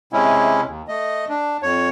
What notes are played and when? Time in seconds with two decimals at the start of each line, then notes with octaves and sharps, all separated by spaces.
0.13 C3 G#3 C#4 E4
0.67 D#2
0.88 A3 D#5
1.29 D4
1.63 F2 C#5